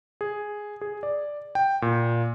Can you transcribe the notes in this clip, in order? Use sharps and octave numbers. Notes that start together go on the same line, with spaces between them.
G#4
G#4
D5
G5
A#2